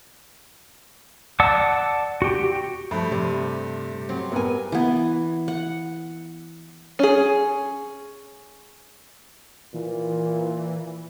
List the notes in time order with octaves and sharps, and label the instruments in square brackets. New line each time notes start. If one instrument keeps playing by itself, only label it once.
[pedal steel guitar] D5 F#5 A5 E6
F#4 G4
[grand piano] G2 A3 [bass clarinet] F3 [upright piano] B5
[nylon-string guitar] C3 G3 [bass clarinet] G4
[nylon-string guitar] F#3 C4
[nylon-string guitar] G2 G#5 [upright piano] B3 A#4
[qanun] E3 B3
F#5
[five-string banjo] C#4 G#4
[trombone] A#2 [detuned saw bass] E3